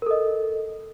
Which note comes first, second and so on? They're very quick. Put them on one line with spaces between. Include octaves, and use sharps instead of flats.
A#4 A4 D#5